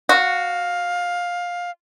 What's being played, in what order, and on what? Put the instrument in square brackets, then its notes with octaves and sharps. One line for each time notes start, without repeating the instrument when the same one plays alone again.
[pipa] F#4 [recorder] F5